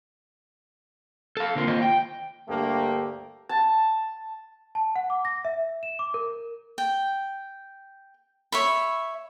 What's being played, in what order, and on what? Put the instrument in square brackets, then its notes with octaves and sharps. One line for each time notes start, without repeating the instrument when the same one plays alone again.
[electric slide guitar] A4 F5
D3 A#3 C4 F4
D#3 A#3 F4 C5 D#5
G5
[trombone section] D2 G2 A3 A#3 G4
[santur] A5
[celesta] A5
F#5
D6
A#6
E5
E7
D6
A#4
[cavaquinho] G5
C#5 E5 B5